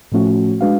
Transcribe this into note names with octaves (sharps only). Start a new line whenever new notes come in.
A2 F3 A3 C#4 F#4
G#3 D4 F#4 B4 F5